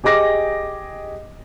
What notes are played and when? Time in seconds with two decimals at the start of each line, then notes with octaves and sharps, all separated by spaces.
0.04 G4 G#4 D#5 D6 A#6